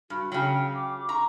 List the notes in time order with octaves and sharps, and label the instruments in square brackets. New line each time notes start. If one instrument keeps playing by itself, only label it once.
[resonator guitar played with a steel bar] G2 [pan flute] F#4
[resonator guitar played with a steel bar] C#3 F#3 [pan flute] G5
[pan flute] D6
[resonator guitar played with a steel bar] A#5 [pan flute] C#6